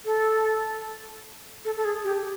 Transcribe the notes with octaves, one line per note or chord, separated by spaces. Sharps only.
A4
A4
A4
G#4
G4